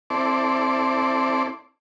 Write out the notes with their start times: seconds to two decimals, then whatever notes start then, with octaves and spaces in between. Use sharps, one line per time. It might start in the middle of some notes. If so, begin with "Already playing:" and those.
0.10 C4 E4 A4 D5 C6 D6